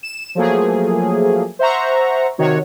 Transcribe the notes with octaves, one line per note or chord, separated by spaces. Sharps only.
E7
F3 F#3 A3 A#3 G#4
C5 E5 F#5 A#5 C#6
C3 D#3 F#4 C#5